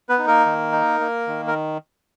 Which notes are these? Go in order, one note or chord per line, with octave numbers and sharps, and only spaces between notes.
B3 B4
D#4
A#3 A#4
D#3
D#4
A#3
D#3
A#4